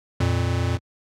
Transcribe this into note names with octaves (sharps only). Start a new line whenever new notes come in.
F2 A#2